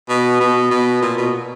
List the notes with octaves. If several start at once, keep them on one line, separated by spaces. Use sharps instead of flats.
B2
B2
B2
A#2
B2